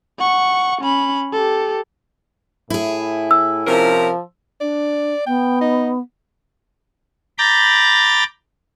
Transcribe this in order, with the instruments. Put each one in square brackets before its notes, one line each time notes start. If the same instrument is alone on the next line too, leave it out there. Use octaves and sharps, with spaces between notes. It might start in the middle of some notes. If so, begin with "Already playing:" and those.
[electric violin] F#5 C#6
C#4 B5
G4 A4
[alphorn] A2 [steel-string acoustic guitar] E4 G#4
[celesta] E6
[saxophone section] C3 C#4 A#4 [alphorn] F3
[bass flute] D4 [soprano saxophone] D5
[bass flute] B3 [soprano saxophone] G5
[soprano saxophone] D#4
[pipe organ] A#5 B5 D6 G6 A6